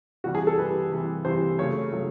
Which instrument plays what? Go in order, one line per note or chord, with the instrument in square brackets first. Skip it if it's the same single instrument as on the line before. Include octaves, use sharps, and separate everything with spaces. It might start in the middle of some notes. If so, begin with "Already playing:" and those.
[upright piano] C3 E3 G3 F#4
G#4
A4
C3 E3 G3 B4
C3 E3 G3
C3 E3 G3 C5
C#3 F#3 A3 C#5
C#3 F#3 A3